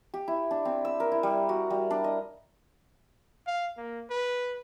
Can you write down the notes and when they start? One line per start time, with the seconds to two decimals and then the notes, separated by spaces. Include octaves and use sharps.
0.14 G4
0.28 E4
0.51 D4
0.65 C4
0.85 E6
1.00 A#4
1.12 E4
1.23 G3
1.49 F#4
1.70 G3
1.90 D4
2.04 D#5
3.47 F5
3.77 A#3
4.10 B4